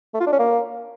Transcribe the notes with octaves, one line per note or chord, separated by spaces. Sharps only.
A3
F4
D4
C#4
A#3